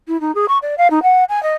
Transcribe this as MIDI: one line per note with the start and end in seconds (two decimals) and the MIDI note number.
0.08 0.20 64
0.21 0.34 63
0.35 0.46 68
0.48 0.58 85
0.62 0.75 74
0.78 0.88 77
0.91 1.03 63
1.03 1.24 78
1.29 1.42 80
1.43 1.56 75